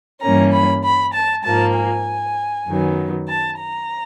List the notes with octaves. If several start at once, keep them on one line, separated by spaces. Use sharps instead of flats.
G2 E3 G3 A#3 C#4 A#5
B5
B5
A5
G#2 F3 A#3 A5
G#5
F#2 D#3 F#3 B3
A5
A#5